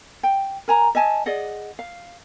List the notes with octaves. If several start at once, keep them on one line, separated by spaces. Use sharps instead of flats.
G5
A#4 G#5 A#5
D#5 E5 G#5 A5
G#4 D5 D#5 F#5
F5